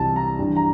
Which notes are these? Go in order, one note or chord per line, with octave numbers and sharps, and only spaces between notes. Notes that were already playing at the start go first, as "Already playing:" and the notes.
Already playing: C2 C3 E3 A5
A#5
G2 E3
A#5